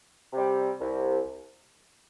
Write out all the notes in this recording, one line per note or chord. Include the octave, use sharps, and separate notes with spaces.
C3 G3
C2